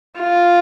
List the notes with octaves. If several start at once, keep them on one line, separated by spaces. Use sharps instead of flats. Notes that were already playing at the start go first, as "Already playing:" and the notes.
F4